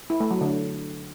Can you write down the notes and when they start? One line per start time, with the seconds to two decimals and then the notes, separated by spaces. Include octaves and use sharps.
0.10 E4
0.20 A3
0.31 F#3
0.41 D3